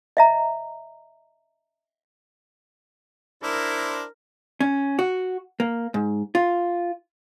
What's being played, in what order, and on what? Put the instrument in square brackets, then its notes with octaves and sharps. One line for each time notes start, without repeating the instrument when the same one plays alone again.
[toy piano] D#5 E5 A#5
[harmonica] D4 E4 C5 [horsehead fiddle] A#4
[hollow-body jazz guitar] C#4
F#4
A#3
G#2
F4